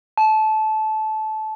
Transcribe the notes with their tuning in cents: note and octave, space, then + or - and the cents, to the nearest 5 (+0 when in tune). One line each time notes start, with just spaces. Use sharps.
A5 -20